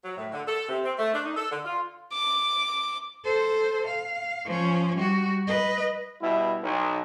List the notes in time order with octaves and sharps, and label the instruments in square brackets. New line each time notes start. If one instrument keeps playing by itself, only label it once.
[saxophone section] F#3
A2
D3
A4
C3
C4
A3
D4
D#4
A4
D3
F4
[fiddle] D6
[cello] A4 C5
F5
F3 C#4
G3 F#4
B4 D#5
[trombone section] B2 G3 E4
B1